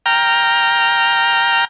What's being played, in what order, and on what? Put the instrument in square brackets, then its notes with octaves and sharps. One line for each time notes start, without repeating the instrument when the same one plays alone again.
[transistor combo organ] G5 A#5 F6